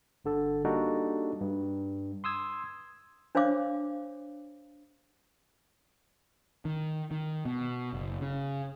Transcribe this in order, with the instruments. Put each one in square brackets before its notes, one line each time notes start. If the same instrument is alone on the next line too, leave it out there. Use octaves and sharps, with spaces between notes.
[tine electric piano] G1 D3 A4
G3 A#3 D4 D#4 F#4 A4
G2
C6 D#6 E6 G#6
[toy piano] D4 C5 C#5 F5 D6
[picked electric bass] D#3
D#3
B2
F#1
C#3